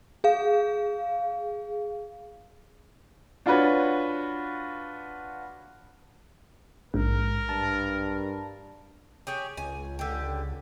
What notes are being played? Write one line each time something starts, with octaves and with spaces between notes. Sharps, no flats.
G#4 F5
D4 F4 F#4 B4 C#5
A#1 G#2 A#4
G2 A5
G4 G#4 C#5
C#2 G#5
D3 G4